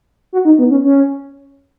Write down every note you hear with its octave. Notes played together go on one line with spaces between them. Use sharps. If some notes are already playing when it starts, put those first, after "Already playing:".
F#4
D#4
B3
C#4
C#4